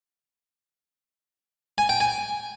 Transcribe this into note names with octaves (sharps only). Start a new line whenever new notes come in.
G#5
G5
G#5